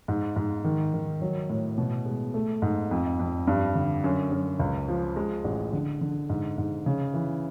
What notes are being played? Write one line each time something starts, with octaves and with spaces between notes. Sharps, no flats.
G#2
G#2
D#3
D#3
F#3
A2
B2
G#3
A3
G#2
F2
F2
G2
D3
F#2
F#2
C#2
F3
G#3
A1
D3
D3
G#2
G#2
C#3
E3